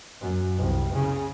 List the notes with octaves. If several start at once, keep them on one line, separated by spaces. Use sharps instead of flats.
F#2
C2
C#3